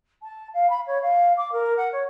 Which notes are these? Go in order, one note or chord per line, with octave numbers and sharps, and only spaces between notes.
A5
F5
B5
C#5
F5
D6
A#4
F#5
C#5